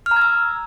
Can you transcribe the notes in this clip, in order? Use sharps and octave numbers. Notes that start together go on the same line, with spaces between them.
F6
A#5
G#6
E6